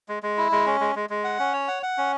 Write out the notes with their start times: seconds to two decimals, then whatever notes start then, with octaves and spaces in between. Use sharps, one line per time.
0.09 G#3
0.23 G#3
0.37 E4
0.52 G#3
0.66 C#4
0.80 G#3
0.95 G#3
1.10 G#3
1.24 F#5
1.39 C#4
1.53 C#5
1.68 F#5
1.83 F#5
1.98 C#4